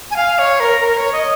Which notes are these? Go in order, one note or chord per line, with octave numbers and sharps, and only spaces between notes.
G#5
F5
C#5
A#4
A#4
C#5
D#5